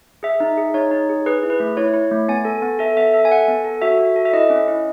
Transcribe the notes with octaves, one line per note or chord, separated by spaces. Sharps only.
G#4 E5
D#4
G#4
D#4 C#5
D#4
G#4
G#4 B4
E4
B4
A3
E4 C#5
E4
A3
B3 G#5
A4
B3
A4 E5
B3 E5
A4 E5
G#5
A4 F#5
B3
A4
F#4 E5
F#4
A4
E5
E4 D#5
C#4
E4